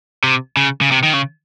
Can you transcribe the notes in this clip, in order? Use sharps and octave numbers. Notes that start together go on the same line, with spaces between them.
C3
C#3
C#3
C3
D#3
C#3